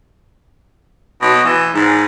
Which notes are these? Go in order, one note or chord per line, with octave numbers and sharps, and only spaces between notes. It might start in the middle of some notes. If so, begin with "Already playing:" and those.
B2
E3
G#2